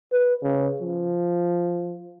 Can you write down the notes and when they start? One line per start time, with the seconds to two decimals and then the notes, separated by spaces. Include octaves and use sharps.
0.12 B4
0.43 C#3
0.82 F3